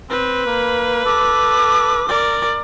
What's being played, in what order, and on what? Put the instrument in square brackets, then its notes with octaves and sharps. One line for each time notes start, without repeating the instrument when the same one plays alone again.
[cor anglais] C4 [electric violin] B4
[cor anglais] A#3
[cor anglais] A4 [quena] D6
[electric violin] A#4 D5